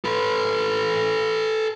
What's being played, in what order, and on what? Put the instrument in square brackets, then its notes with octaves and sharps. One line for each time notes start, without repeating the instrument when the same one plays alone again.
[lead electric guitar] A4 B4